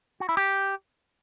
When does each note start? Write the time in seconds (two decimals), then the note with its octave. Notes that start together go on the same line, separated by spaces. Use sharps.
0.20 F#4
0.29 E4
0.37 G4